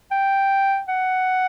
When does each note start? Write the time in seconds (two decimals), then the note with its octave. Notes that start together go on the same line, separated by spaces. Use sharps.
0.11 G5
0.88 F#5